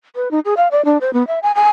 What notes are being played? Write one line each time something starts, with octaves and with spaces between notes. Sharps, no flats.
B4
D#4
G#4
F5
D5
D4
C5
B3
E5
G#5
G#5